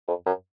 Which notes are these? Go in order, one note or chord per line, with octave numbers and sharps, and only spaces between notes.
F2
F#2